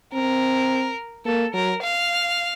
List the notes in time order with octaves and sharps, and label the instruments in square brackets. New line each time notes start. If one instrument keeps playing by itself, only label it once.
[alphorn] C4 [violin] A#4
[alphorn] A#3 [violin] A4
[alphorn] F#3 [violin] A#4
[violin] F5